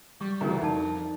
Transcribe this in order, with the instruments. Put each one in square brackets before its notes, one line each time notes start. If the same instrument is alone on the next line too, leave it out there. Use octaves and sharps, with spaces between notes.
[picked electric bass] G3 [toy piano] C#6
[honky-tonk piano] D2 C3 E3 [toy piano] A#4 A#5
[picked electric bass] F2 [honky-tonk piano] D4 [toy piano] D#4 A5